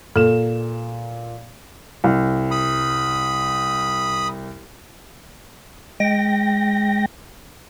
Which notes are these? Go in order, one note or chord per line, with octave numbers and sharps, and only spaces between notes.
A#2 A4 E7
C2
B5 D#6
G#3 G5 A#6